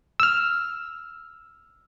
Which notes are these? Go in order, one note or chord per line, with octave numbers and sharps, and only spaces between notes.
E6 F6